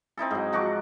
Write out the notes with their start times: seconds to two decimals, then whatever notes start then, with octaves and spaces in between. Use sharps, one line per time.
0.17 C4 D#4 E4 A4
0.31 G#2 F#3
0.53 F3 F#4 C#6 D6